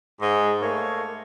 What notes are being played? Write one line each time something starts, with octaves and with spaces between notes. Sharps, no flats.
G#2
A3 A#3 C#5